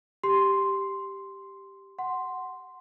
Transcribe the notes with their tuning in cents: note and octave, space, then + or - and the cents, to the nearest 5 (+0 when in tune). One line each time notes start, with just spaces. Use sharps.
G4 +0 C6 +0
F#5 +5 C6 +0